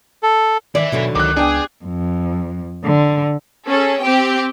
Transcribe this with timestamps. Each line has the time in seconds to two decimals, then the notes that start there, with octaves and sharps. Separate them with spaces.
0.23 A4
0.75 D#3 E3 D5 E5
0.92 D#2 B2 D3 F#3
1.15 C#2 D#3 D6 F#6
1.37 B3 D4 G#4 G5
1.84 F2
2.85 D3
3.67 C#4 G#4 A4
4.01 C4 G4 G5